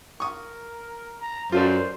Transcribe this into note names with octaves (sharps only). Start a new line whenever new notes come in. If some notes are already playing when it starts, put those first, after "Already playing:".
A#4 C#6 D#6
A#5
F#2 F4 A4 C5 D5